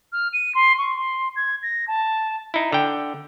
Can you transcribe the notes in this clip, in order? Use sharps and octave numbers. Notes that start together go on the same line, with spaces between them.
F6
D#7
C6
C#6
C6
G#6
A#6
A5
D#4 E4
D3 G5